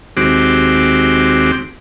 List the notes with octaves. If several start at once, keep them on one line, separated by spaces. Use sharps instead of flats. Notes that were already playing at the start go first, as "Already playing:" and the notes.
D#2 G#3 C4 F#4 G4 D6